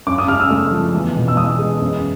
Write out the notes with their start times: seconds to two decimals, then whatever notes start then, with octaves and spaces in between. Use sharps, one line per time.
0.07 F#2 D6
0.18 D#6
0.28 C#3 F6
0.40 E6
0.50 A3
0.72 F3
0.94 E2
1.16 B2
1.28 E6
1.37 E2 D#6
1.59 G#3
1.81 F#2